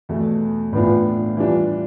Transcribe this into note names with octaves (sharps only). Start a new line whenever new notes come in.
E2 B2 A3
A2 E3 B3 D4 F4
E3 G3 D4 F4